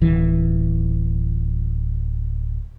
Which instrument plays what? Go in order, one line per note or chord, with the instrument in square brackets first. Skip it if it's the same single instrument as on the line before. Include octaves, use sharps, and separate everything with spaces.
[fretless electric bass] D1 E3